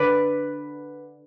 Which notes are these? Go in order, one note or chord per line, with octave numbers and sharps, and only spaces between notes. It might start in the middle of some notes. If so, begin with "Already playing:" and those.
Already playing: D3 B4 D5